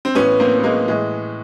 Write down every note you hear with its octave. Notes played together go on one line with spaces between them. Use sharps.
C4
A2 E3 B3 C#4
A#3 C4
B3
G#3 A#3
A2 E3 G#3